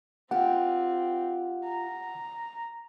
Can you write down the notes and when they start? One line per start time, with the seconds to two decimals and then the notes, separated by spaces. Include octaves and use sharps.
0.31 C4 F4 G4 F#5
1.64 A#5